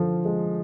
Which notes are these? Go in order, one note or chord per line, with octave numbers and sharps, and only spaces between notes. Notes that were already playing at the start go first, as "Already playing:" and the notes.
Already playing: D3 F3
G#3